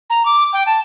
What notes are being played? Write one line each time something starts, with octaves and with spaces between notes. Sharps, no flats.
A#5
D6
G5
A5